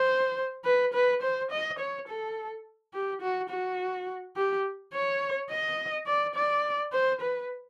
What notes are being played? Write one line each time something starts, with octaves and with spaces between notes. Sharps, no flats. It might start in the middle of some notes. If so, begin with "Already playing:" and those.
Already playing: C5
B4
B4
C5
D#5
C#5
A4
G4
F#4
F#4
G4
C#5
D#5
D5
D5
C5
B4